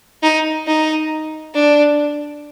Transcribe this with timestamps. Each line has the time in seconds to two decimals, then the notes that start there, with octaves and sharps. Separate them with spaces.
0.22 D#4
0.67 D#4
1.54 D4